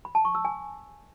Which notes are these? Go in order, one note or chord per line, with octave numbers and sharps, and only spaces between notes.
B5
A5
C#6
E6
G#5